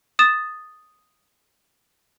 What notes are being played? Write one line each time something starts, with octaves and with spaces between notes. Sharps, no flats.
D#6 A6 E7